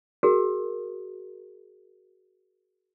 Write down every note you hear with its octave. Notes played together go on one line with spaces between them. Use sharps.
F#4 G#4 A#4